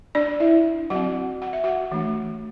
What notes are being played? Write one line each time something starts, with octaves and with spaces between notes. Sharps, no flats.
D4 D5
E4 E5
F#3 C4 F#4 F#5
F#5
E5
F#4 F#5
E3 A3 D4